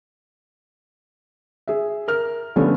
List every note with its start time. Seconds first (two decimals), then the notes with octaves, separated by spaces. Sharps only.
1.68 G#4 E5
2.08 A#4 F6
2.56 D3 F3 G3 A3 B3 C#4